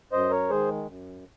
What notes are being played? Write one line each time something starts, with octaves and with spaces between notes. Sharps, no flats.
F#2 C5 D#5
A#4 C#5
D#3 G#3 G#4 C5
F#2